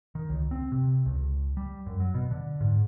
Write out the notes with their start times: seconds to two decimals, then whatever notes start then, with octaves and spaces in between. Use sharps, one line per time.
0.15 D#3
0.29 C#2
0.51 C4
0.72 C3
1.06 C#2
1.57 G3
1.86 F#2
2.00 F#3
2.15 B2
2.31 D3
2.61 G#2